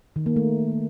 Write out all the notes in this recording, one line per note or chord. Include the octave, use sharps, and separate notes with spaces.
D#3
A#3
A3